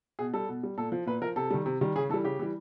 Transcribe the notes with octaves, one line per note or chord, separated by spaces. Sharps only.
B2 G#4
G3 A4
B2
G3
A#2 A4
F3
A#2 B4
F3 A#4
C3 A4
D#3 G3
C3
D#3 G3
C#3 G#4
E3 G3 A4
C#3 G4
E3 G3